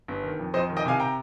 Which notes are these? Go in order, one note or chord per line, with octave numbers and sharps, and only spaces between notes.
G1
D#3
F2
F2 C5 D#5
D#3
D#5 G5
C3 F5 G#5
G5 A#5